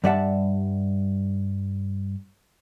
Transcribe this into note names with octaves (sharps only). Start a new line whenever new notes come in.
G2 G3 D5 E5 F#5 A5